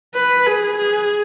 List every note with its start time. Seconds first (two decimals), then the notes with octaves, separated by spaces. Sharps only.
0.15 B4
0.47 G#4
0.78 G#4